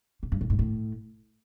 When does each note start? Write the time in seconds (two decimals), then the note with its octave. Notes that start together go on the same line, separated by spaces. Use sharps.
0.23 C3
0.32 G2
0.41 A2
0.50 G#2
0.59 A2